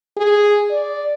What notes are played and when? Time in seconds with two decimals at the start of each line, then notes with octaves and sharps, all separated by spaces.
0.17 G#4
0.71 D5